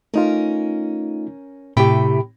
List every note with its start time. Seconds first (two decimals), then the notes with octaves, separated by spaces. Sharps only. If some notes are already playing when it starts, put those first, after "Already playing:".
0.14 A3 C#4 D#4 F4 A#4
1.77 A2 C3 G4 G5 B5